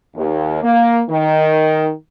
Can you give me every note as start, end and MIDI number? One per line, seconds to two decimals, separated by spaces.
0.15 0.60 39
0.63 1.01 58
1.09 1.89 51